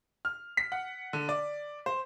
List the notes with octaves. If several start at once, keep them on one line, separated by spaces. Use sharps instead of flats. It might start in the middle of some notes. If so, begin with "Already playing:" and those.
F6
B6
F#5
D3
D5
C5